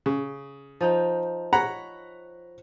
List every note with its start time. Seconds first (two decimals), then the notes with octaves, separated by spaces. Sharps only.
0.06 C#3
0.81 F3 D#4 G5
1.53 C#5 F#5 A#5 B5